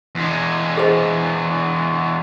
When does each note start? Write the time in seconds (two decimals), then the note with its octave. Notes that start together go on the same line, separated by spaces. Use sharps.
0.15 E2 G#3
0.77 G#4 C5 D#5